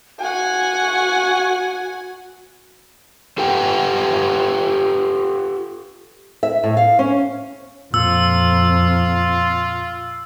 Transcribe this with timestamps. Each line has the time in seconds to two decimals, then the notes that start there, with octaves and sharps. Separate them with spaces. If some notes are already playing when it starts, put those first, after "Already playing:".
0.21 F#4 F#5 G#5
3.38 F4 G4 A4 B4 F#5 G5
6.43 E5
6.64 A2
6.77 F5
6.99 C#4
7.94 F2 A#2 F4 E6